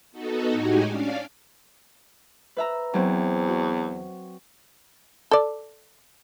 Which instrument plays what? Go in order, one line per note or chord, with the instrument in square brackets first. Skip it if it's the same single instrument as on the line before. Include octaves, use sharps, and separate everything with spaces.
[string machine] B3 D#4 F#4 A4
A2 G#3 D#4 F#4 G4 G#5
C#4 D4 D5 F5
[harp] B4 E5 A#5
[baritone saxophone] E2 [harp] F#3 C4
[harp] F#4
[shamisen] A4 D5